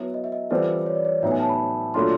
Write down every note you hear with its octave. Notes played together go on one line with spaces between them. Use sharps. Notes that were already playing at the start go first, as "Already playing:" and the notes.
Already playing: F#3 B3 E4
D#5
E5
D#5
E3 G3 C4 F4 A4 D5
C#5
D5
C#5
A2 F#3 B3 D#4 E5
G#5
A5
B5
A#2 F#3 A3 D4 F4 C6